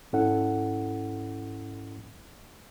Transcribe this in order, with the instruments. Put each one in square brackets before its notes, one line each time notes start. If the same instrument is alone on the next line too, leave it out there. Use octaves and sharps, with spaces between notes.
[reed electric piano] G#2 C#4 E4 A4 F#5